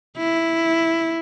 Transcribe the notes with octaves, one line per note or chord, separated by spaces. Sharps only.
E4